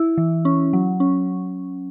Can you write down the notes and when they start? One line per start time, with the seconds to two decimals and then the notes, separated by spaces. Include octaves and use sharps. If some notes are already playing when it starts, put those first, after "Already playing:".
Already playing: E4
0.18 E3
0.45 C#4
0.73 F#3
1.00 C#4